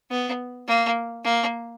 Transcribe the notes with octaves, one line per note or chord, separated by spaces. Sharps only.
B3
A#3
A#3